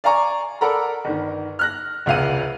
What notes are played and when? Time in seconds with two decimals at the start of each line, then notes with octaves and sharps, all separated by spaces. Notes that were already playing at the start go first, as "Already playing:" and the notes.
0.04 D5 F5 G#5 A#5 C#6
0.61 A4 A#4 D5 F#5 A#5 B5
1.05 G1 D#3
1.59 F6 F#6 A#6
2.06 E1 C#2 C3 F5 F#5 D#7